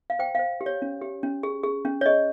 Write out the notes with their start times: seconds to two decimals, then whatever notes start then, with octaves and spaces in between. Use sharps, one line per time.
0.10 F5
0.19 C5 G5
0.35 F5
0.39 C5
0.61 G4
0.66 C#5
0.82 C#4
1.02 G4
1.23 C#4
1.43 G#4
1.64 G#4
1.85 C#4
2.01 C#5
2.06 G#4 D#5